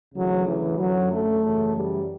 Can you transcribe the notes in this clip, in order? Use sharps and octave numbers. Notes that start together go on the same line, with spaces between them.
D2 C#3 E3 F#3
E3
F#2 D3 F#3
A3
F#2 C#3 E3
G3